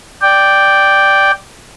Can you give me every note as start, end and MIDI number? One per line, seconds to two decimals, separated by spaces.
0.22 1.31 74
0.22 1.31 79